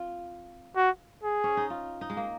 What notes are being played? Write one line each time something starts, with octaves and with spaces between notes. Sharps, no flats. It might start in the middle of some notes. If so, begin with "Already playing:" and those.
Already playing: C4 F4
F#4
G#4
C#4
D#4
F4
D#4
G#3
A#3